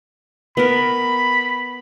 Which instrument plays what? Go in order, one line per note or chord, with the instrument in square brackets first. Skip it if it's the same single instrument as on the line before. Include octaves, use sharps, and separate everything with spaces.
[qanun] B3 A#4 [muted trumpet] B5